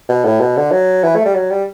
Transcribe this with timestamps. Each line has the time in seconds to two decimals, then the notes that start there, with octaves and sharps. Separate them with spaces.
0.09 B2
0.25 A2
0.40 B2
0.57 D3
0.72 F#3
1.03 E3
1.15 A3
1.25 G3
1.35 F#3
1.51 G3